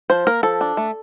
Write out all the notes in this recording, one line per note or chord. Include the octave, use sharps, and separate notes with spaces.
F3 C5
A#3 A#4
F3 A4
D4
A3